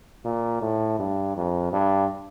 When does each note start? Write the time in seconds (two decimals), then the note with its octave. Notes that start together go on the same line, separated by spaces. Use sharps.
0.24 A#2
0.61 A2
0.99 G2
1.36 F2
1.72 G2